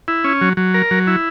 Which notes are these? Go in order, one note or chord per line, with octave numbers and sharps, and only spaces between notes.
E4
C#4
F#3
F#3
A#4
F#3
E4